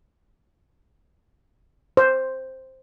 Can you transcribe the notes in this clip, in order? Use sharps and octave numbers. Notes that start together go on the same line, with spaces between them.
C5